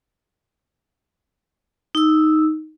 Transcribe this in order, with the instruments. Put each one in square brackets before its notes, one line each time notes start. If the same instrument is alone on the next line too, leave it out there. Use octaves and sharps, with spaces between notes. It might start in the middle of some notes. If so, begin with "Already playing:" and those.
[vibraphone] D#4 E6